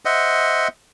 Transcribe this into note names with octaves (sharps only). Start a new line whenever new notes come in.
C5 D#5 E5 F#5